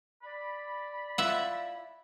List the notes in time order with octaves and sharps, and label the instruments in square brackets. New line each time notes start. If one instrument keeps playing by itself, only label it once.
[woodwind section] D5 B5
[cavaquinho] E4 F4 [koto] E5 F#5